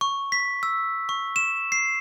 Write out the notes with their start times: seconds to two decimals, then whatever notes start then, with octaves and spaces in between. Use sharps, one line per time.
0.01 C#6
0.32 B6
0.63 E6
1.09 C#6
1.36 E7
1.72 C7